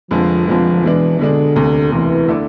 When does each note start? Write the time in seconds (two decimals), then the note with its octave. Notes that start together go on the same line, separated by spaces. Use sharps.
0.11 F1 F2 D3 F3 G#3
0.47 F1 F2 D3 F3 G#3
0.83 B2 E3 G#3 D4
1.19 B2 D3 G#3 D4
1.55 E1 D2 C3
1.92 E1 D2 C3 E3
2.28 D3 A3 E4 A4 D5